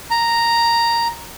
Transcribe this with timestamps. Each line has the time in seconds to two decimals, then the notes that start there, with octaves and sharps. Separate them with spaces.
0.11 A#5